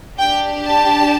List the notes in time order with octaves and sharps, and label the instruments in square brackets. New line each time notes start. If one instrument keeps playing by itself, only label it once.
[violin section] D4 G4 G5
A5